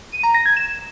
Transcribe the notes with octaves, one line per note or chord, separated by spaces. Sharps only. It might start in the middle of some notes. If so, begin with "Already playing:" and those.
D#7
A#5
A#6
G#6
E7